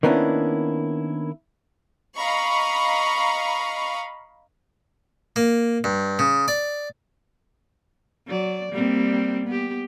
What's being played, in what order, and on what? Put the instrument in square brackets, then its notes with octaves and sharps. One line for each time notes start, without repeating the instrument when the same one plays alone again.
[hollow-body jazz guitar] D#3 A#3 B3 C#4 D4 E4
[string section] D#5 F5 A#5 B5 C#6
[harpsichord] A#3
G2
C#3
D5
[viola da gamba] F#3 D5
G3 A#3 C4
B3 G4